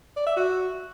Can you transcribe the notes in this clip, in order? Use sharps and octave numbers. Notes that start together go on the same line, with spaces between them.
D5
E5
F#4